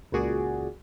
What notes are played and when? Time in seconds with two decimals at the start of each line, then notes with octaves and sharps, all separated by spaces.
0.12 C#2 A#2 F#4 G#4 D5